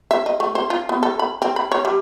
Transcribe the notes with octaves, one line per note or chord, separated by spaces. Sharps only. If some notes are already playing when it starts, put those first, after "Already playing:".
E5
D#5
A3
C5
F4
B3
A4
B5
C4
B5
C#5
G3